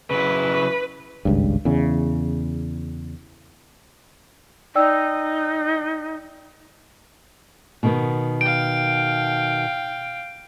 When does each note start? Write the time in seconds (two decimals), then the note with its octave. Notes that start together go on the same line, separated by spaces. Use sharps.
0.11 C#3 F#3 E4 B4
1.25 G#1 C#2 G2
1.65 E2 C#3
4.75 D#4 D5 G5 E6
7.83 B2 D#3 B3
8.41 F5 G5 D7